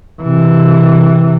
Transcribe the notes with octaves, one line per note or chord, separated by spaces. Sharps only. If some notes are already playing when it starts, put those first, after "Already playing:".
C3 E3